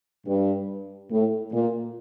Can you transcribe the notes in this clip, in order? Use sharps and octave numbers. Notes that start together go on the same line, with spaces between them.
G2
A2
A#2